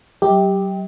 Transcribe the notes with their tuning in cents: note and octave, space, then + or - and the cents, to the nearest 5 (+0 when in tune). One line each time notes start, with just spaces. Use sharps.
F#3 +40 G4 +5 D#5 +45